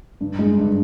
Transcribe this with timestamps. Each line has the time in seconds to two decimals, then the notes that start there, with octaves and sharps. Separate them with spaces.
0.21 G2
0.39 G#3
0.58 G2